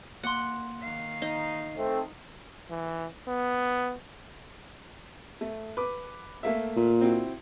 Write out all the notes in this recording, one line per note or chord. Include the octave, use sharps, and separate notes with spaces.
A#3 F#5 C6
D#3 F5
D#4
A3 C4
E3
B3
A3
B4 D6
A3 A#3 E5
A#2
C4 E4 F#4